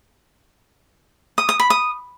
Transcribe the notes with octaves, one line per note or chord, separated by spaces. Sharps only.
D#6
D#6
B5
D#6